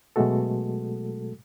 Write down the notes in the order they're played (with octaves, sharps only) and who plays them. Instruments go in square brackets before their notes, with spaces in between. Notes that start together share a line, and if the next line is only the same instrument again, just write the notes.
[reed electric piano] B2 F#3 G#3 A3 F#4 A4